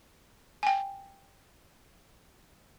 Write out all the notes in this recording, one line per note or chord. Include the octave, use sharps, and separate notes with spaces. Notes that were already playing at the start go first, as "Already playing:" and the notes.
G5 G#5